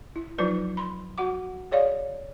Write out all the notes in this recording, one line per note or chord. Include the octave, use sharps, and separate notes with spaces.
E4
F3 F#3 D#4 F4 B4 D5
B5 C6
F#4 F#5 D6
G#4 C#5 D5 F5